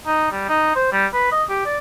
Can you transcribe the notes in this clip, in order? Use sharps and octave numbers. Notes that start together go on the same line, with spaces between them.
D#4
G3
D#4
C5
G3
B4
D#5
G4
D5